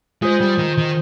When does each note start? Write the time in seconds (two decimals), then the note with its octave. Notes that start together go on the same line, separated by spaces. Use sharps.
0.22 G#3 F4 G#4 C5
0.40 G3
0.58 D#3
0.78 D#3